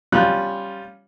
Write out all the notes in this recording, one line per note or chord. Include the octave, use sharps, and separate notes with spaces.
G3 C#4 F4 F#6